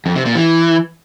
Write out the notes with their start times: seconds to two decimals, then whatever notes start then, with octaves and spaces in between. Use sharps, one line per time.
0.06 F2
0.16 C3
0.25 A#2
0.35 E3